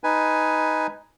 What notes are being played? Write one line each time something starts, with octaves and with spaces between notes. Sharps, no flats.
D#4 B4 G#5